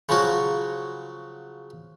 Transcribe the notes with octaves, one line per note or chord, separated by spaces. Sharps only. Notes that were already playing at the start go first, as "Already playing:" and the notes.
C#3 F3 F#3 F#4